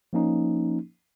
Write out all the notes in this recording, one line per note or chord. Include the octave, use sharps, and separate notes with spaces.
F3 A#3 C#4 D#4